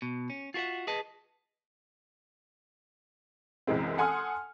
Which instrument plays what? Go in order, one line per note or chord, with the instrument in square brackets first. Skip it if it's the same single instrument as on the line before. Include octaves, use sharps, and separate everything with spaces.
[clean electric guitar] B2
C#4
F4 F#4 G#4 E5 F#5
G#4 B4 D#5 A5
[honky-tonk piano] C2 F#2 E3 G#3 C4
A4 F#5 G#5 C6 D#6 F6